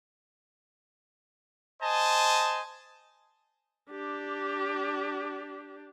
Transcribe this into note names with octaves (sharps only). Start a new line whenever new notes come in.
C5 D#5 G#5 A5
D4 G4